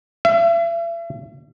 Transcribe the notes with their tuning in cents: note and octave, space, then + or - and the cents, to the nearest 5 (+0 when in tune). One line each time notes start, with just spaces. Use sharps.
E5 +40